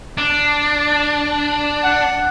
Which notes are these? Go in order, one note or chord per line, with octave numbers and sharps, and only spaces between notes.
D4
F#5